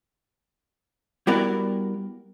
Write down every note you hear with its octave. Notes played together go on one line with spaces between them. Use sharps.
G3 B3 E4 F#4 A#4 D5